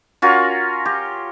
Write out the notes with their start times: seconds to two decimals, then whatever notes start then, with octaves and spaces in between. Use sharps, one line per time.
0.22 C#4 F4 F#4 A#4
0.85 G4